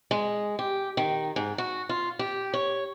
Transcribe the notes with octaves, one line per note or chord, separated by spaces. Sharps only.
G#3
G4
D#3
G#2
F#4
F4
G4
C#5